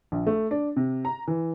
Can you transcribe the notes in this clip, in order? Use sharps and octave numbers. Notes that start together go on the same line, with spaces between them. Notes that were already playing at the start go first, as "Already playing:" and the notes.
A#1
A3
D4
C3
A#5
E3